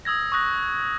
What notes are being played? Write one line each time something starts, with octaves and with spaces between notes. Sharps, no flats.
D#6 E6 G#6 A#6
C#6 D#6 F#6 A#6